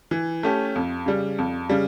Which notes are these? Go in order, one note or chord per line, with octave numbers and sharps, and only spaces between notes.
E3
A3 C#4 G4
F2
C#3 G3
F2
C#3 G3